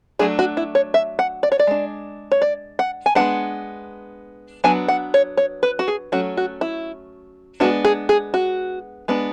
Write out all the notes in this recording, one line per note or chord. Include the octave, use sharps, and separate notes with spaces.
F#3 A3 D4 G#4
F#4
E4
C#5
E5
F#5
D5
C#5
D5
G#3 D4
C#5
D5
F#5
G#5
G#3 B3 D4 F#5
F#3 B3 D4 G#5
F#5
C#5
C#5
B4
F#4
G#4
F#3 A3 C#4 F#4
F#4
E4
G#3 B3 D4 F#4
G#4
G#4
F#4
G#3 B3 D4